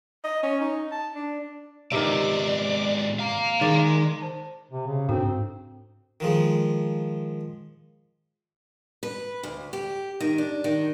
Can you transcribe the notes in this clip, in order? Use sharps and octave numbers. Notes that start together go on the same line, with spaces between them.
D#5
C#4
D#4
A5
D4
G#2 C3 D#3 B3 D5
F5 A#5
D#3 G#3 D5
C5 A5
C3
C#3
G#2 C4 D4 F#4 A4
D#3 F3 G#3
B4
D2
G4
D#3
D4
D#3